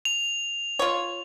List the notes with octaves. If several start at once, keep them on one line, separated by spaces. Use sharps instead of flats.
F7
F4 C#5